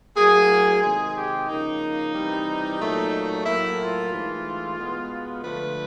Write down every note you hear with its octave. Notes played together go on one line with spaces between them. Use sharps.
A2 F#3 A#3 G#4
C3 D#3 G#3 G#4
G4
C#3 F3 A#3 D#4
C3 E3 G3
A#2 F#3 A3
A2 F#3 A#3 E4
F4
G#2 E3 A3
B2 G#3 B3
D3 F3 A3 B4